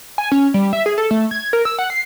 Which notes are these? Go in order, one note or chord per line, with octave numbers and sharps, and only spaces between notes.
G#5
C#4
G3
E5
G#4
A4
A3
G#6
A#4
E6
F#5
C7